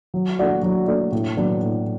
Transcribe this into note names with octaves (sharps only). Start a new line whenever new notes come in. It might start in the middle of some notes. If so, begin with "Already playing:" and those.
F#3
A3 D4 F#4 D5
F#3
A3 D4 F#4 D5
A2
F#3 B3 D4
A2